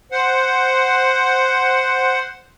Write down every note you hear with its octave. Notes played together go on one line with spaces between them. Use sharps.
C5 F#5